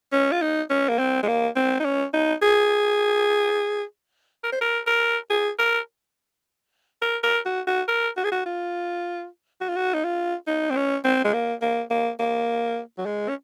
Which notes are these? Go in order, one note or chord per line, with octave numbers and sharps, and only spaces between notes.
C#4
F4
D#4
C#4
A#3
C4
G#3
A#3
C4
D#4
C#4
D#4
G#4
A#4
C5
A#4
A#4
G#4
A#4
A#4
A#4
F#4
F#4
A#4
F#4
G#4
F#4
F4
F#4
F4
F#4
D#4
F4
D#4
C4
C#4
C4
G#3
A#3
A#3
A#3
A#3
F#3
G#3
C#4